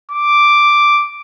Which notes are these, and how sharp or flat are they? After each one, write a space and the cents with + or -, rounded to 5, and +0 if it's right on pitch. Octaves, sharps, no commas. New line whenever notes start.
D6 +0